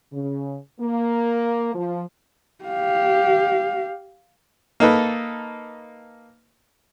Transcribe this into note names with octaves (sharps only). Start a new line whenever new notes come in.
C#3
A#3
F3
G4 F5
A#3 D#4 A4 B4